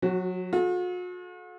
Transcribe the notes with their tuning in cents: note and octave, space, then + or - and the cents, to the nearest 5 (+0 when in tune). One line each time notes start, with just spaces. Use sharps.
F#3 -25 F#4 +15
F#4 -45 A4 -35